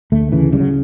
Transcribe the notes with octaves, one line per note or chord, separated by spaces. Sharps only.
D2 A3
C#3 E3
C#3 G3
F#3